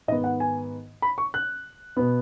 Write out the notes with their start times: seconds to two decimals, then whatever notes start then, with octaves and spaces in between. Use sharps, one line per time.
0.08 G#2 D#3 B3 D#5
0.24 F#5
0.40 G#5
1.02 B5
1.18 C#6
1.34 F#6
1.97 B2 B3